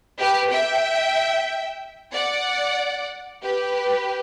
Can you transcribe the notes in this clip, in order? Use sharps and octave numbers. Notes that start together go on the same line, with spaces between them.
G4 B4
E5 G5
D5 F#5
G4 B4